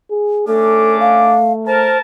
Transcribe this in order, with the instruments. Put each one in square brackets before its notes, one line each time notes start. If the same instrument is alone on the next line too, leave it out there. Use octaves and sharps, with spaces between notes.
[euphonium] G#4
[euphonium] A3 [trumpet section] C#4 D4 D6 [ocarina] A4
[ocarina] F5
[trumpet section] A#4 A5 [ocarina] C5